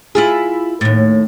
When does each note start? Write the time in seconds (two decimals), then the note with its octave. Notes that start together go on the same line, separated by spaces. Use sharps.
0.15 E4 F4 G#4
0.81 D#2 A2